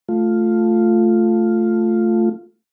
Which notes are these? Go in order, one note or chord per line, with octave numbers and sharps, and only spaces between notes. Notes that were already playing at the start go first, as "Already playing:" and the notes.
A3 F4